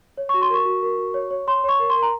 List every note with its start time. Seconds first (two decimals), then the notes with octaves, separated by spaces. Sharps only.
0.18 C#5
0.29 F#4 C#6
0.42 C6
0.50 A#4 C#6
0.65 F#4
0.82 A#4
0.98 F#4
1.14 C#5
1.31 C#5
1.47 C#5 C6
1.64 C#5 C#6
1.80 A#4
1.90 C6
1.96 A#4
2.02 A#5